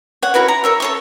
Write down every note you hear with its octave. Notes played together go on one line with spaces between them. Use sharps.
C#5 F#5
E4 F#4 A#4 B4
A#5
A#4 C#5 E5
A4 C#5 C#6